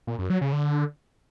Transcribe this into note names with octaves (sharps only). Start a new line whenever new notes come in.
A#2
F#2
F#3
C#3
D3